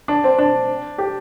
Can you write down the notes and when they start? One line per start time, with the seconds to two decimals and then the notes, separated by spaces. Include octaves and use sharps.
0.08 D4
0.24 C4
0.38 D4
0.98 G4